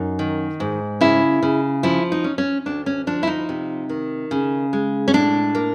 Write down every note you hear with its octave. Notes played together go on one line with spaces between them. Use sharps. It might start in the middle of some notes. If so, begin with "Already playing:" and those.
Already playing: F#2 D#4
D#3
G#2
C#3 E4
C#3
F3 E4
D#4
C#4
C#4
D2 D4
C#4
F3 D4
E4
D#4
C3
D#3
C#3
G#3
C#4
A2 D4
A#3